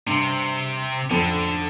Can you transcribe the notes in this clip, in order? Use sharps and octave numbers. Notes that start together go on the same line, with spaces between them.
G2 C3
F2 D3